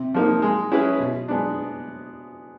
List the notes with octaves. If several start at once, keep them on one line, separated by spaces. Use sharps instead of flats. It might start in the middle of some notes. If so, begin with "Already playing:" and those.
Already playing: C3
F3 A#3 D#4
G#3
C#4 E4 G#4 B4
B2
G#3 B3 D4